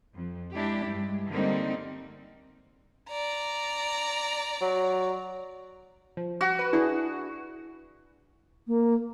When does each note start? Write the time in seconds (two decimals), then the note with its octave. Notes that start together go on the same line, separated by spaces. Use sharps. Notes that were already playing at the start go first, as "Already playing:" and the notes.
0.15 F2
0.55 G#3 D4 E4 G4
0.86 G2 G#3
1.30 D3 G3 A#3 C4 D#4
3.10 D5 A#5
4.61 F#3
6.17 F3
6.41 F#4
6.59 B4
6.73 D4 E4 G#4
8.68 A#3